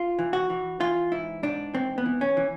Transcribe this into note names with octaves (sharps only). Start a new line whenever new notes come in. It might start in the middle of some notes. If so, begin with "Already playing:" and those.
Already playing: F4
E3
F#4
E3
E3 F4
G#2 E4
G#2 D4
E3 C4
B3
E3
C#4
E3